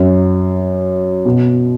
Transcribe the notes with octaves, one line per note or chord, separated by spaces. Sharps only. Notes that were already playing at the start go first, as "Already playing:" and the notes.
Already playing: F#2
B2